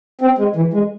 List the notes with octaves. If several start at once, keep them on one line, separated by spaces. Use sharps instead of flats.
C4
G#3
E3
G#3